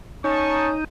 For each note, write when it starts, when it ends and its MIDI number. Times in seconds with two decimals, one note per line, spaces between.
0.24 0.74 61
0.24 0.84 63
0.24 0.68 81
0.24 0.68 85